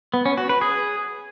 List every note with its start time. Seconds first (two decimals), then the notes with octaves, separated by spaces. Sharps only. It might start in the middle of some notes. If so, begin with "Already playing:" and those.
0.14 B3
0.26 C#4
0.37 F#4
0.49 B4
0.61 G#4